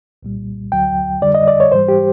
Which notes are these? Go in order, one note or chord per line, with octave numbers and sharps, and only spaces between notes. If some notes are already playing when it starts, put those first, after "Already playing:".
C2 A#2 G3
D2 D3 F#3 G5
F2 D3 G3 D5
D#5
D5
C#5
G#2 E3 G3 C5
G4